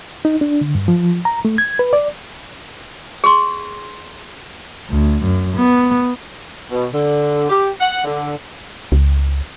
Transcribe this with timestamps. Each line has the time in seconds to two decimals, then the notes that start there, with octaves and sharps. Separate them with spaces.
0.25 D#4
0.41 D4
0.61 D3
0.75 G2
0.88 F3
1.25 A#5
1.45 A3
1.58 G#6
1.79 B4
1.93 D5
3.24 G#4 C6
4.91 D2
5.24 F#2
5.57 B3
6.71 B2
6.93 D3
7.49 G4
7.80 F#5
8.05 D3
8.92 C#2